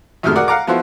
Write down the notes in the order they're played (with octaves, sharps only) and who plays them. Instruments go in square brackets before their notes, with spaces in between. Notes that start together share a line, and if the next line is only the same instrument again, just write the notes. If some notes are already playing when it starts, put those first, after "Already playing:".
[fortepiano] F#2 A2 C3 D#3 G#3 F6
F#4 G#4 A#4 D5 F#5
F5 F#5 A#5 D6
F3 B3 E4 F#4 C5